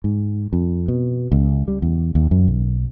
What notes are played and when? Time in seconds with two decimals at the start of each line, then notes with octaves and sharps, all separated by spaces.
0.04 G#2
0.53 F2
0.88 B2
1.32 C#2
1.68 G3
1.82 E2
2.15 D#2
2.31 F#2
2.48 B1